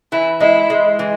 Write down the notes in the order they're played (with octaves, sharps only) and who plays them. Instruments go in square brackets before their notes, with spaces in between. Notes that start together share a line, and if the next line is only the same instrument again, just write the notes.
[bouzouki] E3 [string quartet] E4
[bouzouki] G#3 [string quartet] E4
[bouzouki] G#3
E3